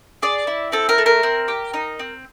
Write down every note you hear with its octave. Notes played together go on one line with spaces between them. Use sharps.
G#4 D5
E4
C4 A4
A#4
A3
A#4
C4
G4
D#4
C4